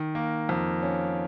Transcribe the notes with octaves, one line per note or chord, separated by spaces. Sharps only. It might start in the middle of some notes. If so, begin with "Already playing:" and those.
Already playing: D#3
A#3
F2
C#4